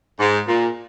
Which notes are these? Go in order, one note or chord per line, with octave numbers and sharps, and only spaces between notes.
G#2
A#2